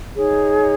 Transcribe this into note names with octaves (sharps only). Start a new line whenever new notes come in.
D#4 G#4 C#5